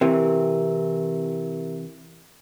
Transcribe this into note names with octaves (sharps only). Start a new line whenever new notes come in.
C3 E3 G4 A#4 E5